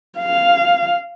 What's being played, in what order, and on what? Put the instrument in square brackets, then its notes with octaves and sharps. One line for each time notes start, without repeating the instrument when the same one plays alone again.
[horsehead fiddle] F5